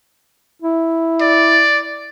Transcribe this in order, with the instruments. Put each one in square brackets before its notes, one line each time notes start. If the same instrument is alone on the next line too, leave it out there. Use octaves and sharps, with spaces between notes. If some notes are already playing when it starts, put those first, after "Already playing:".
[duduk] E4
[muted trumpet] D5